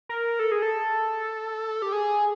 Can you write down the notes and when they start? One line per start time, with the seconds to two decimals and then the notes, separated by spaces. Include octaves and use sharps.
0.09 A#4
0.39 A4
0.52 G#4
0.62 A4
1.82 G4
1.92 G#4